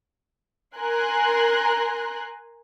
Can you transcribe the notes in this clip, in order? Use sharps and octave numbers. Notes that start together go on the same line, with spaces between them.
A#4 G#5 A#5 C6 F#6